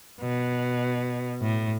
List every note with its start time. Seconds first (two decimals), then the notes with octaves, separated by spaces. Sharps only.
0.21 B2
1.41 A2